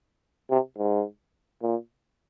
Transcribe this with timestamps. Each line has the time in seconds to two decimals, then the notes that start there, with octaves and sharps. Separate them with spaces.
0.50 C3
0.78 G#2
1.62 A#2